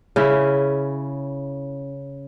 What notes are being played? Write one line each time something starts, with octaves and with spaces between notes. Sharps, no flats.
C#3 C#4 E4